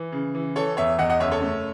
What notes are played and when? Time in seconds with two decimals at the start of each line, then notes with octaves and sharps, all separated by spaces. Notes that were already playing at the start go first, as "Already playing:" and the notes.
Already playing: E3
0.12 C#3
0.35 E3
0.56 E3 A4 C#5
0.77 E2 C#5 E5
0.98 E2 D#5 F#5
1.10 D#5 F#5
1.20 F#1 C#5 E5
1.31 A4 C#5
1.41 A3